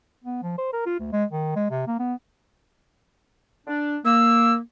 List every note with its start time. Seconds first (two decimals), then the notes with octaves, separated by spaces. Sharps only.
0.24 B3
0.42 F3
0.58 C5
0.73 A#4
0.86 F4
1.00 D2
1.12 G#3
1.32 D#3
1.56 G#3
1.70 C3
1.87 A#3
1.99 B3
3.67 D4
4.05 A#3 E6